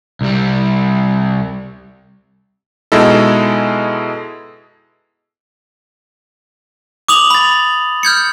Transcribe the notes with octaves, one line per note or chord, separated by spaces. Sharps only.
C2 G3
B2 G#3 D#4 E4 A4
D6 D#6 F7 F#7
B5 A6
F6 G6 G#6 C#7